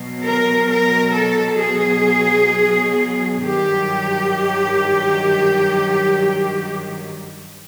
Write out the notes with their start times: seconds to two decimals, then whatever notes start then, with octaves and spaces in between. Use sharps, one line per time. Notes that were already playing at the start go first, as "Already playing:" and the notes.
Already playing: B2 F#3
0.23 A#4
0.68 A#4
1.13 A4
1.59 G#4
3.41 G2 D#3 F#3 G4